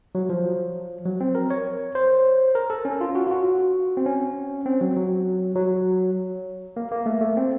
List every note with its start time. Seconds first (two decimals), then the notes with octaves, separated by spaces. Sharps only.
0.15 F#3
0.29 F3
1.06 F#3
1.21 C4
1.35 A#4
1.50 C#5
1.95 C5
2.55 A#4
2.70 A4
2.85 C#4
3.01 F4
3.15 F#4
3.27 F4
3.31 F#4
3.97 C4
4.06 C#4
4.66 C4
4.81 F#3
4.96 F#3
5.55 F#3
6.77 A#3
6.92 A#3
7.06 A3
7.21 A3
7.37 C4